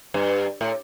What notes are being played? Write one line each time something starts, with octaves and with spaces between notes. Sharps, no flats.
G2
A2